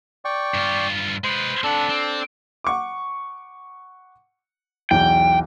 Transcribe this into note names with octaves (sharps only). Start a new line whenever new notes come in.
D5 G5 C#6
G2 F4
G#3 B4 C5 C6
C4 D4 A4 F#5
C4
F#5 C#6 D6
B1 E2 G5